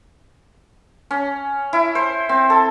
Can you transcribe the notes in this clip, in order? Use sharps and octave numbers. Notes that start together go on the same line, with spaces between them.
C#4
E4
C5
C4
A4